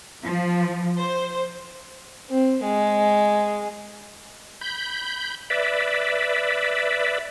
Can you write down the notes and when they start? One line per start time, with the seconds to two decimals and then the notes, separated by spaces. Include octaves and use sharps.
0.24 F3
0.99 C5
2.30 C4
2.64 G#3
4.61 B5 G6
5.50 B4 D5 E5